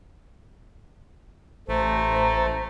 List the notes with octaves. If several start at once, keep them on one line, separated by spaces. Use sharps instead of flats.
A1 A3 C5 A#5